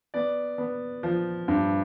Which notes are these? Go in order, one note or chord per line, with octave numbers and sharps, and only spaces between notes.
B3 D5
B3
F3
G2